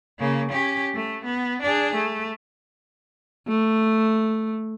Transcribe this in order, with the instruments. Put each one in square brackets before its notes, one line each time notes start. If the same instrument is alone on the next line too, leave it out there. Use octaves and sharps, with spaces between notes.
[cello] C#3 A#3
C#4 G4
A3
B3
D4 G#4
A3
[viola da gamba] A3